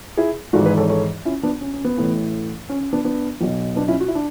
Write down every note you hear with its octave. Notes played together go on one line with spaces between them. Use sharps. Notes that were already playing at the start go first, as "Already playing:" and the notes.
E4 G#4
G#1 G#2 E3 F#4 A4
G#4 B4
A4 C#5
A4 C#5
C#4 E4
B3 D4
C#4
C#4
B3
A1 A2 E3
C#4
C#4
B3 D4
B3 D4
B1 B2
B3 D4
C#4 E4
F#4
E4
D4